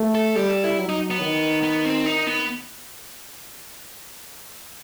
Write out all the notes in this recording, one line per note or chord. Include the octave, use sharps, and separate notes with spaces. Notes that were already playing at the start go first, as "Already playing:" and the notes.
Already playing: A3
A4
G3 G4
A4
E4
F#3
D#4
B3
D#3
B3
C4
D#4
B3